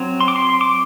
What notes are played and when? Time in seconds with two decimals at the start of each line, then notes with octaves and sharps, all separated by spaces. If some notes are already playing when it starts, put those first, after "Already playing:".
Already playing: F#3 C4
0.21 C6
0.28 D6
0.36 C6
0.61 D6